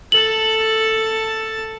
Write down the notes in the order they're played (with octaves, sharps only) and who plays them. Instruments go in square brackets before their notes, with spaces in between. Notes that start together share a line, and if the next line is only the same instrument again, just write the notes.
[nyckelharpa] A4 A5 [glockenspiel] F#7